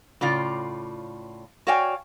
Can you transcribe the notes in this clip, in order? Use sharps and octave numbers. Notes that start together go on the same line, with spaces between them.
A2 C#3 F4 D5
F#4 C#5 D5 F5 G5 G#5